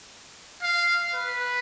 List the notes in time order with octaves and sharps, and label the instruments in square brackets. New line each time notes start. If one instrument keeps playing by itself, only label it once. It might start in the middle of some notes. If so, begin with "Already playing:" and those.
[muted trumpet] F5
B4